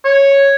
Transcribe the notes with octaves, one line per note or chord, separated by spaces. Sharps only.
C#5